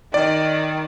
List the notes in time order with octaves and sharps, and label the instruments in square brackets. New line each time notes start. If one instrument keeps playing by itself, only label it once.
[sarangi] D#3 [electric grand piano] D5